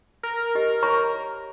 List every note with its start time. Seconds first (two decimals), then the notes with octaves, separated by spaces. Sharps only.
0.23 A#4
0.55 G4 D#5
0.83 C#5 A#5 C#6